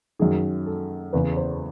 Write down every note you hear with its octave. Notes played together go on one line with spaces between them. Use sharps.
F#2 D#3 G#4
A4
E2 C#3 E3 B4
C5